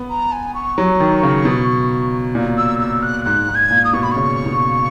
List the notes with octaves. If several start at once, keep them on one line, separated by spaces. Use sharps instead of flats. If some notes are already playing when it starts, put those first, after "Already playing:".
Already playing: B3
A#5
G#5
C#6
F#3
D#3
C#3
B2
A#2
E6
E6
F#6
G#2 F#6
G#2
G#6
A#2
D#6
B2 C#6
B5
C#3 C#6
B2